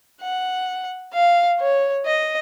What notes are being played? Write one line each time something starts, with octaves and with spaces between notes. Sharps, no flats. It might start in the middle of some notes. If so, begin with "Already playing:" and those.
F#5
F5
C#5
D#5